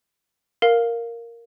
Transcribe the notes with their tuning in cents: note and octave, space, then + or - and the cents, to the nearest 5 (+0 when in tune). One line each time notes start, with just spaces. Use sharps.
A#4 +0 F5 +0